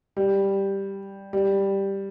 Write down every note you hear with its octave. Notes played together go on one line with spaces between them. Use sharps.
G3
G3